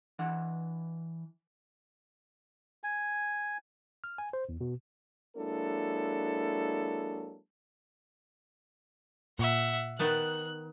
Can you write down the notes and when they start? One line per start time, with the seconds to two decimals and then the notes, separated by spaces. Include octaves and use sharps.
0.19 E3 D4 F#5
2.84 G#5
4.04 F6
4.18 G#5
4.33 C5
4.49 E2
4.61 B2
5.37 F#3 G#3 A#3 D4 E4 A4
9.39 A#2 E5 F#5
9.99 D#3 B3 A5 F#6